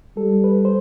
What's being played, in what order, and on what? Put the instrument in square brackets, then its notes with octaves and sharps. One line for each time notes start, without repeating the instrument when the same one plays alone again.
[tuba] G3 [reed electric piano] A4
[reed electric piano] B4
C5